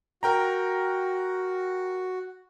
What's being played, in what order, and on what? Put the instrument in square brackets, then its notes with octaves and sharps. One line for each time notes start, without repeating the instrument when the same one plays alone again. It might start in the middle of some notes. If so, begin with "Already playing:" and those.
[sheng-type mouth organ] F#4 [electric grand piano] A#4 G5 A#5